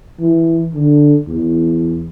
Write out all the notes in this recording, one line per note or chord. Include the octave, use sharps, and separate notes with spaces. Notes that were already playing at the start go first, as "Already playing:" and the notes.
E3
D3
E2